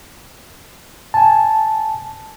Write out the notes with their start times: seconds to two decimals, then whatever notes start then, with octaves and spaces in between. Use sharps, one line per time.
1.14 G#5 A5